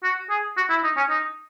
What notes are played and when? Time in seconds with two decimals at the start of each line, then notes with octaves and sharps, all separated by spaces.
0.03 F#4
0.30 G#4
0.57 F#4
0.70 E4
0.84 D#4
0.97 C#4
1.10 D#4